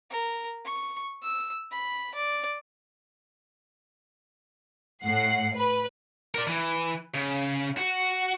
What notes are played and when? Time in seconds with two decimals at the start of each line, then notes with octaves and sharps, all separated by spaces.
0.10 A#4
0.65 C#6
1.22 E6
1.71 B5
2.15 D5
5.03 A2 F#5 C7
5.56 B4
6.34 A#4 D5
6.48 E3
7.15 C#3
7.77 F#4